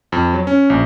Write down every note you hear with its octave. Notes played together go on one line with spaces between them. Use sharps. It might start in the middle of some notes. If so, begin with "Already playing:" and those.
F2
F#3
C#4
A#1